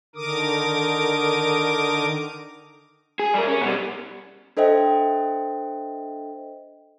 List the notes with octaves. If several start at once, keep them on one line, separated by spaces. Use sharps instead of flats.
D3 D#3 A#4 D6 D#6
G#4
G3 A#4
C#4
B2 G3
D4 A4 C5 D#5 E5 G5